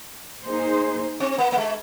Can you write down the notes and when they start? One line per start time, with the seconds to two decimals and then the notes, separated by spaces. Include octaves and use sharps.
0.46 A#3 D#4 G#4 C5
1.20 C4
1.38 A#3
1.52 A#3
1.57 G#3